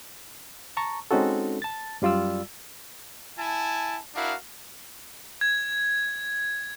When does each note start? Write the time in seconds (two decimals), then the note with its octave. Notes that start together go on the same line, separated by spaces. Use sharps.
0.77 A5 A#5 C#6
1.11 G#3 C4 C#4 D#4 F#4 A4
1.62 A5 A6
2.02 F#2 G3 F4 D5 E6
3.39 E4 G#5 A5
4.14 D4 E4 F#4 A#4 F5
5.41 G#6